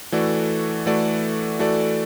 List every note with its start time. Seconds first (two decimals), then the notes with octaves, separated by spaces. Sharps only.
0.12 E3 A3 F#4 A4 D5
0.86 E3 A3 F#4 A4 D5
1.59 E3 A3 F#4 A4 D5